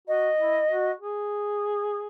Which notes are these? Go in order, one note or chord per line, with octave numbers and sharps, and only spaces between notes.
F#4 D#5
E4
F#4
G#4